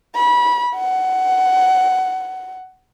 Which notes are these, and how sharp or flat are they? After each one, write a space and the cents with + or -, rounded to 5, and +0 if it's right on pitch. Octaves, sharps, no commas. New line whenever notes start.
B5 -25
F#5 +15